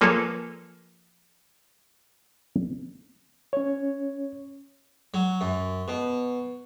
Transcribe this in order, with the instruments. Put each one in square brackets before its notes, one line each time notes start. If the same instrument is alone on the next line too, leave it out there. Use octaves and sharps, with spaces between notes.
[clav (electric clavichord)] F3 A#3 G#4 A4 B4 C#5
[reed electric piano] C#4 C#5
[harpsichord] F#3
F#2
B2